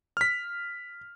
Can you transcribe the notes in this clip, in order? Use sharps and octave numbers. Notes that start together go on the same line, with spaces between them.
F6 B6